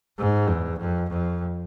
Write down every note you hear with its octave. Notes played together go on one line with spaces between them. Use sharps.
G#2
E2
F2
F2